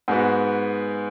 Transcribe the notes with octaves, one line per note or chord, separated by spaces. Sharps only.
G#2 G#3 B3 F#4